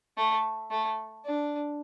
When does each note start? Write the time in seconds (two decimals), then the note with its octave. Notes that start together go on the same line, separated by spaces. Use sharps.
0.17 A3
0.71 A3
1.25 D4